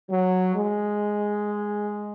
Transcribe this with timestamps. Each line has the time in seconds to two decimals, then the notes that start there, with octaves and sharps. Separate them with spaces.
0.09 F#3
0.55 G#3